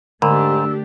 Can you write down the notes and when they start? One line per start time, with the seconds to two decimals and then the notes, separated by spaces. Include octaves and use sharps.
0.22 G#2 D3 A3 D4 G4 E6